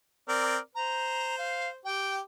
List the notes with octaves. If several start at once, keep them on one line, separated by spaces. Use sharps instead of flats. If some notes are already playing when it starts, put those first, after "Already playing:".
C4 A#4 D5
C5 A#5
F5
G4 G5